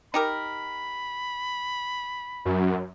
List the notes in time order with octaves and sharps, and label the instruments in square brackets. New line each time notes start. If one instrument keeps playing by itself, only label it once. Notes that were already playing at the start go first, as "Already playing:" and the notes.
[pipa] D#4 G4 A#4 [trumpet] B5
[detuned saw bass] F#2